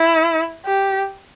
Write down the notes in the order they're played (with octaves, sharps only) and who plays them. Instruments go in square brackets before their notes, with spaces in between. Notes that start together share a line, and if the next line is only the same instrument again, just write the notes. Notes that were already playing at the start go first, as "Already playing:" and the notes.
Already playing: [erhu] E4
G4